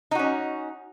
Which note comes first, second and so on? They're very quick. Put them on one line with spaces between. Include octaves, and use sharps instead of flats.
D#4 F#4 C#4